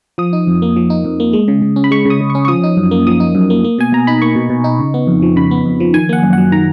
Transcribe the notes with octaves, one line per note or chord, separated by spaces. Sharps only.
F3 D#6
D#4
F2
A#3
F3
D#4
F2
A#3
G#3
C#3
C#3
C#4
B5
G#3 C#6
C#3 D#6
C#3
C#6
C#4
C#6
F3 D#6
D#4
F#2
A#3
F3 D#6
D#4
F#2
A#3
A#3
B2 G#5
B2 A#5
D#4 B5
A#3 C#6
B2
B2
D#4
C#3
B3
F2
F3
C#3 B5
B3
F2
F3
D#3 G#5
A#3 F#5
F#2
F#3 F#5
D#3 A#5